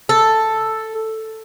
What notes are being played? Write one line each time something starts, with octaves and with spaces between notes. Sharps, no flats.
A4